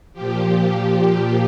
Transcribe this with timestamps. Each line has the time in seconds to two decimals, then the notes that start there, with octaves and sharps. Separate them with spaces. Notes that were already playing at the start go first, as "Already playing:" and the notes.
0.13 F3 G4
0.19 A#2
0.88 G4